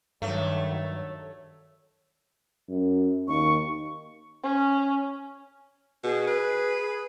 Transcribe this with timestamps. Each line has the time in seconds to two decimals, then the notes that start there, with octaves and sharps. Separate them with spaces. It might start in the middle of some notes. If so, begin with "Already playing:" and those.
0.22 G2 D#3 F#3 A3 C#5
2.69 F#2
3.28 D#2 C#6
4.44 C#4
6.04 B2 G#4
6.28 B4